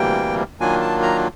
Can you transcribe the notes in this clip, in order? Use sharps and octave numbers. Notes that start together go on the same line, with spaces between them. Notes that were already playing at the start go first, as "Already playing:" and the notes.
Already playing: D2 C3 E3 G3 A#3 G5
D#3 F#3 A#3 D4 F4 G#5
A5
A#5